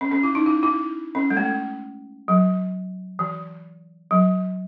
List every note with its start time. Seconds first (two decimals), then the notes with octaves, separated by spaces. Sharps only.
0.01 C#4
0.12 C#4
0.23 E4
0.35 D#4
0.46 E4
0.63 E4
1.15 C#4
1.30 G#3
1.37 A3
2.28 F#3
3.19 E3
4.11 F#3